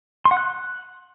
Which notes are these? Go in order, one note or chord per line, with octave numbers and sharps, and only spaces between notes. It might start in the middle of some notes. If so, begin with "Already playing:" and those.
C6
F#5
F#6